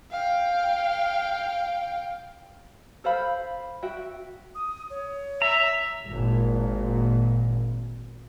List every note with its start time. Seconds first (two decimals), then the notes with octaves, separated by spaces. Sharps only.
0.11 F5 G5
3.04 A4 C5 F5 B5
3.82 F#4 E5 G5
4.55 D#6
4.90 C#5
5.42 E5 A#5
6.10 G#1 A#2